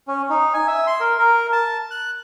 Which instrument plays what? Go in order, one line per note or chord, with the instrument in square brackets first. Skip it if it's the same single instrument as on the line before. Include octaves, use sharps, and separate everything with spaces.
[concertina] C#4
D#4
G#5
E5
C6
A#4
A#4
A5
F#6